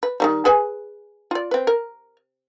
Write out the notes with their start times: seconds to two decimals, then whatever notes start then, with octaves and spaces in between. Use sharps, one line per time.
0.03 B4
0.20 D#3 E3 G3
0.45 G#4 B4 G#5
1.31 F4 D5
1.51 C4 B4
1.67 A#4